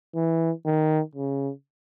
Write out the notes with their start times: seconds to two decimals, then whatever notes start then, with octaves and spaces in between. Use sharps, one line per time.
0.15 E3
0.65 D#3
1.15 C#3